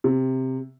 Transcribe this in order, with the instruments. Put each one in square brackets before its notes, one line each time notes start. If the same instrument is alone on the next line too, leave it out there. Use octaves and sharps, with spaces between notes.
[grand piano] C3